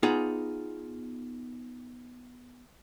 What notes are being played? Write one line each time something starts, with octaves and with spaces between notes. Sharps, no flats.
B3 D#4 F4 G#4 D5 G#5